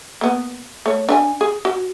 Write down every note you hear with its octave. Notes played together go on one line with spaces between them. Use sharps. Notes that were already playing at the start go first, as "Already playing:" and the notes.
A#3 B3
A3 C#5
D4 E5 G#5
G#4
F#4